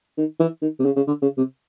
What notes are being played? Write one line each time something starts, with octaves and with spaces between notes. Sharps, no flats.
D#3
E3
D#3
C3
C#3
C#3
D3
C#3
C3